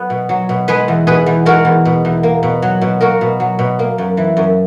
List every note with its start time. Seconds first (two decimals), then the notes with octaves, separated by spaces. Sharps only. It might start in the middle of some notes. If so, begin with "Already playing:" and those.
Already playing: F#3 B3
0.10 B2
0.29 F#3
0.49 B2
0.68 G#3 G#4 B4
0.88 E2
1.07 B2 G#4 B4
1.26 E2
1.45 G#3 F#4 A#4
1.65 E2
1.85 B2
2.05 E2
2.23 A#3
2.43 B2
2.62 F#3
2.81 B2
3.01 A#3 F#4 A#4
3.21 B2
3.40 F#3
3.59 B2
3.79 A#3
3.98 F#2
4.17 E3
4.37 F#2